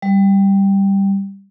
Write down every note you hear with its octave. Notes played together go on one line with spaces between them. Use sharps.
G3